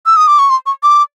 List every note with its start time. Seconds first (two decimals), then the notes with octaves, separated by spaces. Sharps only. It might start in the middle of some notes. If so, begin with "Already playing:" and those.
0.06 E6
0.17 D#6
0.28 D6
0.39 C#6
0.50 C6
0.66 C#6
0.83 D6